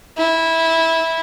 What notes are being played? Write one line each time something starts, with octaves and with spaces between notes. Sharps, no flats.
E4